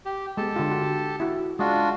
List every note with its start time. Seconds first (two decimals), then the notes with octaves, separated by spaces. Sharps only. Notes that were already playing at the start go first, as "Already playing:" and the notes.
0.06 G4
0.37 G#3 B3 G4 A4 A5
0.56 D3 F4
0.72 F#4
1.20 E4 F#4
1.59 G#3 D4 F4 F#4